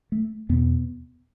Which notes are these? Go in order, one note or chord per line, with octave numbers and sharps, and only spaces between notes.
A3
E2 B2 B3